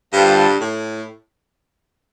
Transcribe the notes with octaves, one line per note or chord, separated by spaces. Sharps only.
G2 D3 G3 F4 A4 C5
A2